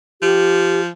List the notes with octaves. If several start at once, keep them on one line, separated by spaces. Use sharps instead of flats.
F3 G4